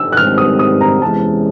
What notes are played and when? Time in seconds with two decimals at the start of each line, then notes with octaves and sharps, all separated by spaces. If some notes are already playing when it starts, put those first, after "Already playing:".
Already playing: E6
0.12 F#6
0.17 G#2 D#3 G3 C4 F6
0.38 D#6
0.59 D#6
0.81 A#5
1.02 E2 C3 E3 G#3 C#4 A5